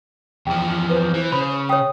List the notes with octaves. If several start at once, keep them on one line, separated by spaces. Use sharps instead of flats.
E2 F3 G5
B4 C5
E3
C#3 B5
C#5 G5 D#6